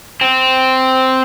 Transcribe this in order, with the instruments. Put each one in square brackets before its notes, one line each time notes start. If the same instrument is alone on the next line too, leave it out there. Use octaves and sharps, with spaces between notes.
[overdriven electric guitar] C4